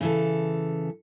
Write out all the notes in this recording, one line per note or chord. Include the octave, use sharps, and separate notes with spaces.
C#3 E3 A4